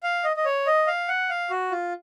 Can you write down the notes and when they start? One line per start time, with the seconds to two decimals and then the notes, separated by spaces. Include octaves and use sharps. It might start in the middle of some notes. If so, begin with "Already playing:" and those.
0.03 F5
0.24 D#5
0.36 D#5
0.45 C#5
0.67 D#5
0.87 F5
1.08 F#5
1.29 F5
1.50 F#4
1.71 F4